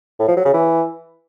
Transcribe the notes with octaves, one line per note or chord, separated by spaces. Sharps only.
A2
F3
F#3
C#3
E3